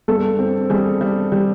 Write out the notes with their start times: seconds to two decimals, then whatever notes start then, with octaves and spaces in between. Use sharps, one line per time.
0.08 G2 A4
0.39 C4
0.69 G3 G#4
1.01 G3
1.32 G3